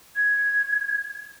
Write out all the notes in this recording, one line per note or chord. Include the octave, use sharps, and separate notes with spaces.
G#6